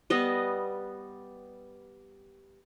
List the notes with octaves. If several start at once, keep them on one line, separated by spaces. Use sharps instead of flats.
G3 B3 D#5